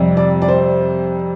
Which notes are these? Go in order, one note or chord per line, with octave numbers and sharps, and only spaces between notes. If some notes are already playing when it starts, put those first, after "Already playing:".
Already playing: F2 C3 G3
D5
D5
C5